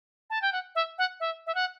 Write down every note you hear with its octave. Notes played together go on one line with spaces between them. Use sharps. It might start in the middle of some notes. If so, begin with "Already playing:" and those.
A5
G5
F#5
E5
F#5
E5
E5
F#5